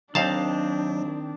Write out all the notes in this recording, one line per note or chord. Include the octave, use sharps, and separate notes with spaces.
D#2 D#3 F#3 C4 D4 F5 A5